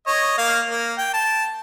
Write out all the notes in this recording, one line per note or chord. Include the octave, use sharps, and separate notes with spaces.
C#5 D#5
A#3 F5
A#3
G5
A5